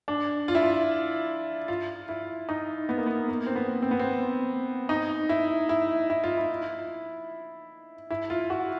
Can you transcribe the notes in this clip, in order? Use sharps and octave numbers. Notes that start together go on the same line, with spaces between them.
D4
F4
E4
F4
F4
E4
D#4
B3
A#3
B3
A#3
C4
B3
C4
B3
C4
D#4
E4
E4
E4
F4
E4
E4
F4
F#4